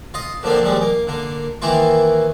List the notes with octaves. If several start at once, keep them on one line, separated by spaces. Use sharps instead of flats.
F4 D#5
D3 F3 A#3 C4 D4
D#2 F3 G3 G#3
A#3
D3 A#3
D#3 E3 A#3 E4 F4